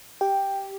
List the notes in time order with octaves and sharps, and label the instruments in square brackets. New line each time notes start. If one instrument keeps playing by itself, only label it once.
[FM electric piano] G4 [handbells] G5